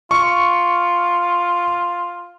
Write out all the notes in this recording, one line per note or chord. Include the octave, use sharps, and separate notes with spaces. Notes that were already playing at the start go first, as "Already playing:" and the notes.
F4 C#6